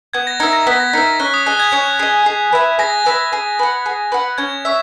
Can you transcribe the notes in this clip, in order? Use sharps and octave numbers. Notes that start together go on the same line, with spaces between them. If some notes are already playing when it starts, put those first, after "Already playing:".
B3 G#6
A#6
D#4 A#4 E5 G#6
A#6
B3 B6
A#6
D#4 A#4 E5
C#4 F#6
D#6
G#4 D#5 F#6
G#6
C#4
G#4 D#5
G#4
B4 E5 G#5
G#4 A#6
B4 E5 G#5
G#4
B4 F#5
G#4
B4 F#5
C#4 G#6
C#5 E5